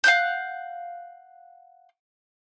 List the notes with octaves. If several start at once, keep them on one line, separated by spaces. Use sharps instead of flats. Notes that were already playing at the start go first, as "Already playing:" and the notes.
F5 F#5 F#6 G6